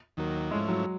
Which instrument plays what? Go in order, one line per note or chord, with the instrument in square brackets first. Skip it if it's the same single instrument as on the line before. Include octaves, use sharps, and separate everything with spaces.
[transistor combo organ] D#2 D#3 F#3 A#3
[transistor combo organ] G#2 F3 A3 C#4 E4 [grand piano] G#3
[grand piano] F#3